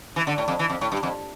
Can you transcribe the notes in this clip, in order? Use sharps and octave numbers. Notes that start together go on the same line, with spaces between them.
E3
D3
A2
F2
E3
F2
A2
G2
F2